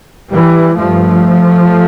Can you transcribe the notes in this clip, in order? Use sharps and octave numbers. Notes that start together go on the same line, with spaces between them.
E3 G3
G2 F3 A3